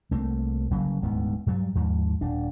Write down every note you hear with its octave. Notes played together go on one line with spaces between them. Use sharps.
C2 A3 A#3 C4
G1 C#3 F#3 A#3
D#1 D2 G#2 B3
G2 F#3 G3
D#2 G#2 F3
D#1 D4